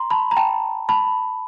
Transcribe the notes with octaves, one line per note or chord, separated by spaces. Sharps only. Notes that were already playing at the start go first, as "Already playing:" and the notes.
Already playing: A#5 C6
A5 B5
A#5
G5 A5
A5 B5